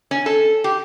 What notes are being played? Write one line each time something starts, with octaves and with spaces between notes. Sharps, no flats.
C#4
A4
G4